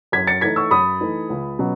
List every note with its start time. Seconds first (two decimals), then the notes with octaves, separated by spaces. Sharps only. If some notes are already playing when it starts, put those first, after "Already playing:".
0.12 F#2 G#6 B6
0.27 A6 C#7
0.41 E3 A3 D#4 G#6 B6
0.56 C#6 E6
0.71 F#2 B5 D#6
1.01 E3 A3 D#4
1.30 C#2
1.59 B2 F#3 C#4